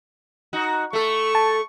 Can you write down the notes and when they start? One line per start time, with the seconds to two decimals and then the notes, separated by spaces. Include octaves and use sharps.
0.53 D#4 F#4
0.93 A3 A4 C#6
1.35 A5